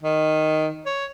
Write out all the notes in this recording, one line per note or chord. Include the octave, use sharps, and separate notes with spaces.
D#3
C#5